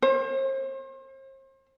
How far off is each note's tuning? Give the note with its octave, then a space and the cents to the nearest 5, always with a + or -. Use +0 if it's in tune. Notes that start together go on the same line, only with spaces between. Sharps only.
C5 +40